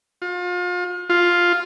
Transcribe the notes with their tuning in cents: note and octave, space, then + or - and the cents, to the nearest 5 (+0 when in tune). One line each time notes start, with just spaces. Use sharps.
F4 +35
F4 +5